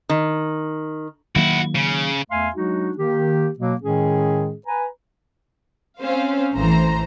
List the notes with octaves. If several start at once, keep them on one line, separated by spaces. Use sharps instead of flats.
D#3
D#3 F#3 A#3 E4 F#4
C#3
E2 A3 E5 F5 G#5 C6
F#3 G#3 D4 D#4 F#4
D#3 A#3 G4
B2 F#3 A#3
A2 D#3 G#3 C#4 G#4
B4 G#5 A#5
C4 C#4 C5 F5
A1 E3 A3 C5 A#5